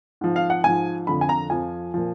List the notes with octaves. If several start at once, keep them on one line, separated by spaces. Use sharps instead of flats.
G#2 F3
F5
F#5
G#2 F3 G#5
F2 D3 F3 B5
G#5
A#5
F2 F3 G#5
A#2 F3